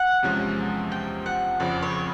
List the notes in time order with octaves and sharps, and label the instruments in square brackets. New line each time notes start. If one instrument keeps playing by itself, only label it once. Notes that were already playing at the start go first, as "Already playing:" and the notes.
Already playing: [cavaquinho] F#5
[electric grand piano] E2 C3 F3 G#3 C#4
[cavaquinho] G5
F#5
[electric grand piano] F2 C#3 F3 [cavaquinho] D5
[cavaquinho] C#5